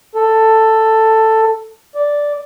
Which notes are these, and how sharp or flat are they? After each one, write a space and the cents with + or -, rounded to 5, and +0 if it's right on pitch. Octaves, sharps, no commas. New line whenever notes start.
A4 +10
D5 -5